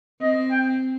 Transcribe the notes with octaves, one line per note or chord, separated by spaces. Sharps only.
C4 D#5
G5